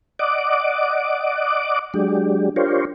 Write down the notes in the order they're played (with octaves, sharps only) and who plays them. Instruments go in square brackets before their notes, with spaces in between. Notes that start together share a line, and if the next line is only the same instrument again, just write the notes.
[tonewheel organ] D5 D#5 F#5 D6
F#3 G#3 D4 G4
D4 F4 G4 A#4 C5 C#5